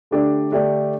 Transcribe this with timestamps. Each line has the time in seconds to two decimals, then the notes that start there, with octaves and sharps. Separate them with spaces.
0.11 D3 A3 D4 G4 D5
0.51 D3 A3 D4 G4 D5